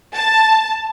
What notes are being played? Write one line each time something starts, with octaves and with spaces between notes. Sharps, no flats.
A5